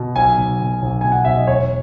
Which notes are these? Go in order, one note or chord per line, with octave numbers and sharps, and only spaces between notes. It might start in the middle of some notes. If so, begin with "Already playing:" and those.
Already playing: B2
B1 G#5
B1
B2
B1
B2 G#5
F#5
B1 E5
D#5
E1 C#5